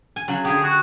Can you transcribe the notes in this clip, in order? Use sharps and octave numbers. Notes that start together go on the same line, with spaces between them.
G#5
C#3 F#3
D3 G4 G#4
F#4